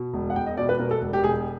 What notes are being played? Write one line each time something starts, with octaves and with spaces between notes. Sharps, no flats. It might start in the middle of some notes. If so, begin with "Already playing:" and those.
Already playing: B2
E1
F#5
E1 G5
D#5
B2 D5
B4
B2 A#4
A4
E1
G4
E1 G#4